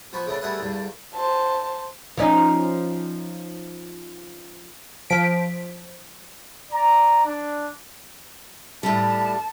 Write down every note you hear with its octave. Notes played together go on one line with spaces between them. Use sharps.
F3 B3 B5 C#6
C#3 A3 B3 D4
G3 A3 B3 G#4 E5 F#5
E2 G2 D3
C5 A5
F3 C#4 D#4
F3 B6 D7
D5 A#5
D4
A2 G3 A5